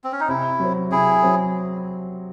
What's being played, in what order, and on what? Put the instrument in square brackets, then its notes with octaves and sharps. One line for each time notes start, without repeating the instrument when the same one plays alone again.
[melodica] C4
C#4
D#4
[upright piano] C3 [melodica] E4
[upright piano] F#3 C4
[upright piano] C3 [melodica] E4 G#4
[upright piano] F#3 C4